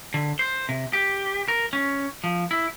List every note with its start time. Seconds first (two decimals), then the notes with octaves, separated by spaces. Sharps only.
0.14 D3
0.39 C5
0.69 C3
0.93 G4
1.48 A#4
1.73 C#4
2.24 F3
2.51 E4